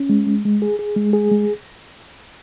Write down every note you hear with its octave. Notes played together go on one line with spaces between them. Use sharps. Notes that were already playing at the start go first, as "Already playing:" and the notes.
Already playing: C#4
G#3
G#3
G#3
G#4
G#4
G#3
G#4
G#3